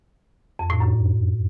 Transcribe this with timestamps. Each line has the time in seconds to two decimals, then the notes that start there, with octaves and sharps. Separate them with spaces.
0.59 F2
0.70 A2
0.80 F#2